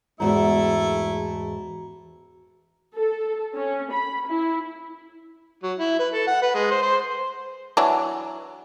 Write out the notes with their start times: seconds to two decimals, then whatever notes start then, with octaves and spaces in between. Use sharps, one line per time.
0.20 E2 G#2 A3 E4 F#4 A#5
2.96 A4
3.54 C#4
3.92 B5
4.27 E4
5.63 F#3
5.79 E4
5.99 B4
6.14 A4
6.27 F#5
6.42 B4
6.55 G#3
6.71 C5
6.82 C5
7.77 E3 F#3 D4